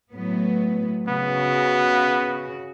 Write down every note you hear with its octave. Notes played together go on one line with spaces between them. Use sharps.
A2 F#3 B3
C#3 B3 F#4